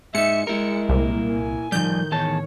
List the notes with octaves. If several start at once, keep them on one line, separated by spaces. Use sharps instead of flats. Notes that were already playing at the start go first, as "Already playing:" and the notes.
G#2 D#4 E5 C#7
G#3 E4 A#4
C2 A#2 A#3
G#5
A2 D#3 F3 G3 G6
E2 C#5 A5